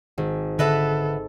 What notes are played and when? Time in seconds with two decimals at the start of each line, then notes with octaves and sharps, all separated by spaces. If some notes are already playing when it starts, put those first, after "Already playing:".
0.18 G#1
0.59 D3 A4 B4 E5 F#5 A#6